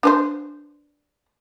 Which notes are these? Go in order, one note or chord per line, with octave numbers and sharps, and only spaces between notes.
D4 B4 C5